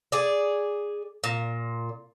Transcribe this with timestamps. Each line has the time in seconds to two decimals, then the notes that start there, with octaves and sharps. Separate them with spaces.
0.12 G#4 D5
1.24 A#2